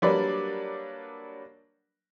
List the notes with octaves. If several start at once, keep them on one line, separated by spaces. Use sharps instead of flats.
F#3 G3 A#3 D4 B4 D5